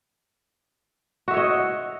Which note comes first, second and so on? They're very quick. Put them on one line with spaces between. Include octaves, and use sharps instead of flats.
F#4 E5 C#5 D#5